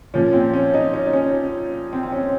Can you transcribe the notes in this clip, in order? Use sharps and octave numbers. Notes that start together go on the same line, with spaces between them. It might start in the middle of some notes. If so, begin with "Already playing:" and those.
A#2 F3 C#4
C4
C#4
D#4
C#4
D#4
C#4
C4
C4
C#4